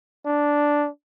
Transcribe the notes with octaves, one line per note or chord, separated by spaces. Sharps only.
D4